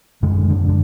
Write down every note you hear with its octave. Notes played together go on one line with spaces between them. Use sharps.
F#2 D3 G#3
D3
D3